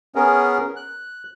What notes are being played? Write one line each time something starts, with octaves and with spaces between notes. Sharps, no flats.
B3 C#4 G#4 A#4
F#6